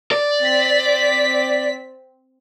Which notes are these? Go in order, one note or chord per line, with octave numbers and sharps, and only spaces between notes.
D5
C4 B6